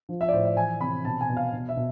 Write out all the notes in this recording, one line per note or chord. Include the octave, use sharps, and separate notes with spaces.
F3
E5
D5
A2 C5
E5
E3 G#5
C3 B5
B2 A5
G#5
B2
F5
B2
E5
B2